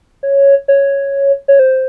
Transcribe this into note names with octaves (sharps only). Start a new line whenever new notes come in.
C#5
C#5
C#5
C5